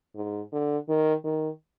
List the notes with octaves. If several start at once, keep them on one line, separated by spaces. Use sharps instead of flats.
G#2
D3
D#3
D#3